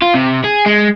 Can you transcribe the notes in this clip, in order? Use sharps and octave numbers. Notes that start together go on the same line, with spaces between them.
F4
C3
G#4
G#3